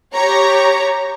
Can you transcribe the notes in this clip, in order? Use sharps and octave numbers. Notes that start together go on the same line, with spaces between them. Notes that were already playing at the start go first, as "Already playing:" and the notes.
G4 C#5 A#5